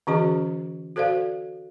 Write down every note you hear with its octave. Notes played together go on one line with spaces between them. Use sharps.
D3 E3 C#4 F#4 G#4 D#5
F#4 A4 C5 D5 F5